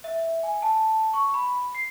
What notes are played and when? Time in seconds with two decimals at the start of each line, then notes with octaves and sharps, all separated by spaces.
0.04 E5
0.43 G#5
0.62 A5
1.13 C#6
1.34 B5
1.75 C7